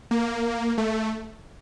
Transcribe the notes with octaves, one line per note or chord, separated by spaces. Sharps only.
A#3
A3